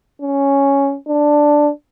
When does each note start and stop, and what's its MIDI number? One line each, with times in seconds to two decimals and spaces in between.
0.21 0.96 61
1.08 1.71 62